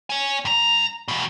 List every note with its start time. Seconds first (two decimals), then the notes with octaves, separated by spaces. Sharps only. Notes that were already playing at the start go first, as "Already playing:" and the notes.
0.10 C#5 G#5
0.45 G2 A#5
1.08 E2 B2